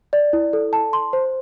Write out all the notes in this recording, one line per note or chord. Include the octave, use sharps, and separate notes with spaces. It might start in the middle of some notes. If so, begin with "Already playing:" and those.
D5
E4
A4
A5
C6
C5